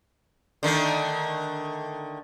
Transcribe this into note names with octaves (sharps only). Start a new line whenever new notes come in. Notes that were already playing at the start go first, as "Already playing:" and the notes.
D3 D#3 A3